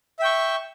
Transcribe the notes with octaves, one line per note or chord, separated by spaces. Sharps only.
E5 G5 C#6